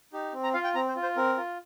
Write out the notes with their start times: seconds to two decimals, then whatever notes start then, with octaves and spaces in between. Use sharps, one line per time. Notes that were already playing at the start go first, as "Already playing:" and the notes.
0.13 D#4 G4
0.33 C4
0.44 A#5
0.54 F4 F5
0.64 G5
0.75 C4 A#5
0.88 C5
0.96 F4
1.03 C5
1.16 C4 A#4
1.37 F4